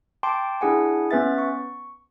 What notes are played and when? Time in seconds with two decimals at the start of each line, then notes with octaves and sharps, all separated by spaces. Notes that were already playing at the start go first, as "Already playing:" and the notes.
0.23 G5 A5 C6 D6
0.61 D4 E4 G#4 F#5 G#5
1.11 B3 C#4 B4 E5 A6
1.38 C#6